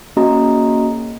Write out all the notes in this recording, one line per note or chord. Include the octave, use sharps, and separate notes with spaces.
A#3 C#4 F#4 G#4 D#5 A#5